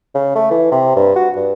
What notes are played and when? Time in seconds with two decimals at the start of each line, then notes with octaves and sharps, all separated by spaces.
0.15 C#3
0.35 A3
0.51 E3
0.72 C3
0.96 G2
1.16 F#4
1.36 G2